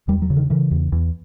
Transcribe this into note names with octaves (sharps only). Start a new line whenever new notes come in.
E2 G3
F#3
C#3
D#3
C#3 E3
E2
E2